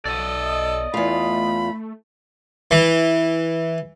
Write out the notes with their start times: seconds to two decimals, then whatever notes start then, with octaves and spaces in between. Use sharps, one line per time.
0.05 B1 A4 D5 D#5
0.94 E2 A3 F4 B5
2.71 E3